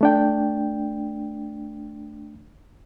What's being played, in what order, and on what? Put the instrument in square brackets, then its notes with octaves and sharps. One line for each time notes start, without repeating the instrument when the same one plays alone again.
[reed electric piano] A3 D4 G5